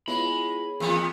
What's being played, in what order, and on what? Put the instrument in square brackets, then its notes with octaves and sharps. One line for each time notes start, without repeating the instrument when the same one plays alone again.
[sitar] G#3 [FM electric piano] B3 C#5 [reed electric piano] E4 F4 [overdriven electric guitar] B5
[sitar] E2 B3 [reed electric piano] A#3 F4 [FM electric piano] G#4 D#6 E6